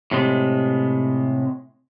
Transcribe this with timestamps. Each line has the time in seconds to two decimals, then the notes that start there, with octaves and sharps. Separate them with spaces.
0.11 A2 C3 G#3